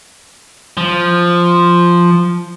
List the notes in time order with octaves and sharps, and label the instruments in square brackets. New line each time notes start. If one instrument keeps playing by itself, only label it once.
[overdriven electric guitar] F3